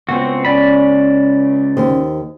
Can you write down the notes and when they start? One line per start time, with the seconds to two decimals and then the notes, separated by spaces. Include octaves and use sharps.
0.09 C#2 B3 C4 F#4
0.45 C#4 D5 B5
1.77 D#2 D#4 C5